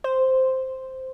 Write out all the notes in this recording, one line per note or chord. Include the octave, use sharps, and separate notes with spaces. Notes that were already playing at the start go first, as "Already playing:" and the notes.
C5